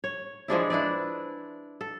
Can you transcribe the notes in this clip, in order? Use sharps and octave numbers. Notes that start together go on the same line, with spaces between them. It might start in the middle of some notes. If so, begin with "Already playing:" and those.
C#5
F3 G#3 D4 E4
D4 E4 B4 D5
A4